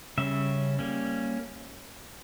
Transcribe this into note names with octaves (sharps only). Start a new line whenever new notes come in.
C#3 G3 C#4 E5
G3 A#3 C#4